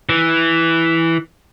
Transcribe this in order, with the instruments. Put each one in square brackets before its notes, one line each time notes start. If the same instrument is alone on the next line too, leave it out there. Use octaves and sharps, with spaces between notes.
[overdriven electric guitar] E3